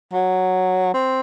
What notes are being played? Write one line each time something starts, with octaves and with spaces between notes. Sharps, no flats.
F#3
C4